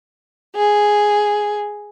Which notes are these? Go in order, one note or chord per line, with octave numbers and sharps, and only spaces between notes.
G#4